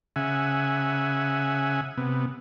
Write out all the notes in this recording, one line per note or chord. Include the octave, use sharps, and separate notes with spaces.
C#3 E5 F#5 G#5
C3 B3